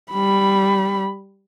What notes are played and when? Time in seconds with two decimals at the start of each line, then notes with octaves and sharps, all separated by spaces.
0.12 G3 B5